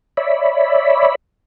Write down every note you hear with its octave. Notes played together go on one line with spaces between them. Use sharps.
C#5 D5 E5 B5